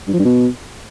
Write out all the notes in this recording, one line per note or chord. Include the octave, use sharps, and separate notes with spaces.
G2
F3
G2
B2